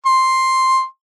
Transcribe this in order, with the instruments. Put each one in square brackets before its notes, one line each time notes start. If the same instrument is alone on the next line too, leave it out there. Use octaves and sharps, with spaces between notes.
[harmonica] C6